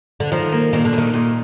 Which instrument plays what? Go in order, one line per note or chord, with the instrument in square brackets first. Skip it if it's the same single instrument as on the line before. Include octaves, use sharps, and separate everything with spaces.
[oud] D3
[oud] D#3 [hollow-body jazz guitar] F3
[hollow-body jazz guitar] A#3
[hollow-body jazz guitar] A#2 [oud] D#3
[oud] D3
[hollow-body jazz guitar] A#2
[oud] D#3
[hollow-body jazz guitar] A#2